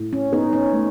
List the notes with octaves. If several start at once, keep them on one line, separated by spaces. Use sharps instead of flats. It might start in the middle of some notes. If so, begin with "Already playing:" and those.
Already playing: A2
C#4
B3 D#4
C#4
A3